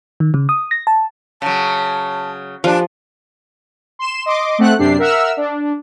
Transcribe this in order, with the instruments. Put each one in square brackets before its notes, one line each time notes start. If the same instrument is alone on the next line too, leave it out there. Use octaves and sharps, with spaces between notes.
[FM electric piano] D#3
C#3
D#6
A#6
A5
[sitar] C#3 F#3 [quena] A5
[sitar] A#2 D4 [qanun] F3 [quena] G4
[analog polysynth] C6 E7
D#5 C6 D6
A3 C4 F#5 F#6
F#2 C3 D4 G4 C7
A#4 E5 F#5 E6 F6
D4